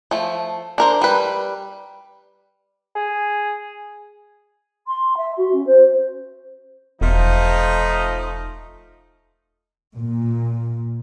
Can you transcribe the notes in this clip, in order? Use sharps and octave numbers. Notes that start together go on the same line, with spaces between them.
F3 A3
D4 A#4 C5
G3 B4
G#4
C6
E5
F#4
C#4
C5
E1 F3 A3 D#4
A#2